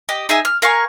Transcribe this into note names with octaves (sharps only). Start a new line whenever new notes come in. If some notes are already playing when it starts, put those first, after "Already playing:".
G4 D#5
D#4 G#4 E5 G#5
F6
A#4 F5 G#5 C#6